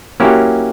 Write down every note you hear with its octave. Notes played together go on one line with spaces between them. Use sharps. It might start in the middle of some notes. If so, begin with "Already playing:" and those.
F#3 A#3 C#4 E4 G4